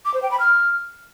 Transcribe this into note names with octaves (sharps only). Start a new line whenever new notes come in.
D6
C5
G5
B5
F6